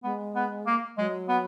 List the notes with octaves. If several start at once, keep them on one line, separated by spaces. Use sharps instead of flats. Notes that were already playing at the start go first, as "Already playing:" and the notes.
G#3 B3
B3
A#3
F#3 G#3
B3